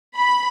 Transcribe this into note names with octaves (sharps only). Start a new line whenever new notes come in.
B5